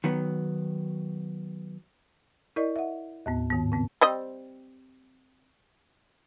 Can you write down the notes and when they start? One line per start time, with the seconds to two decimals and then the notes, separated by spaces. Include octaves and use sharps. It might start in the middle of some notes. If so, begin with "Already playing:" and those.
0.04 D#3 F#3 B3
2.56 E4 A#4 D5 D#5
2.76 E5 F#5
3.26 D#2 A2 B3
3.50 G#2 D#3 B3
3.72 C#3 B3 C4
4.01 G3 C4 D#5